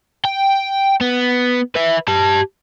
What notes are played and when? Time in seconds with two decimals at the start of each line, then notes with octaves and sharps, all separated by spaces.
0.25 G5
1.01 B3
1.75 B4 E5
2.08 G4 A5